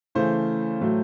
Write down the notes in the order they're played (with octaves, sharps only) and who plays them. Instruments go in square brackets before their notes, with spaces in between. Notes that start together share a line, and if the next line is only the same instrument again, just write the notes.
[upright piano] C#3 E3 A3 C5
A2 F#3 A3